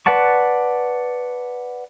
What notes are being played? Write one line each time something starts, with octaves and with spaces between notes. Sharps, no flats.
B4 D5 F#5 A5 C#6